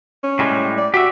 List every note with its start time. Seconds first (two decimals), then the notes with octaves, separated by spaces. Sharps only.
0.24 C#4
0.39 A2 G3 G#3
0.78 D5
0.94 F#4 G4 E5